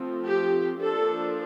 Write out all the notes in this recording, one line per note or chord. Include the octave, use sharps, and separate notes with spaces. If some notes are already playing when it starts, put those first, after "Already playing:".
Already playing: F3 A3 C4
G4
F3 A#3 D4 A4